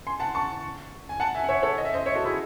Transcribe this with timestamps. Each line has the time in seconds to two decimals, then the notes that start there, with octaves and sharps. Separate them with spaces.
0.07 G#5 C6
0.20 F#5 A5
0.35 A5 C#6
1.09 G#5
1.20 F#5 A5
1.35 E5 G#5
1.44 F#5
1.49 C#5 E5
1.63 A4 C#5
1.78 D#5
1.85 E5
1.94 C5 D#5
2.06 C#5 E5
2.15 F#4 A4
2.24 E4 G#4